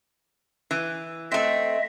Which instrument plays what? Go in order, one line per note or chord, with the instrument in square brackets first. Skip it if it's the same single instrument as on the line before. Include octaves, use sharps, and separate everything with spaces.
[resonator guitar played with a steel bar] E3
[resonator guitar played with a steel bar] A3 C4 [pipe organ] D#5 E5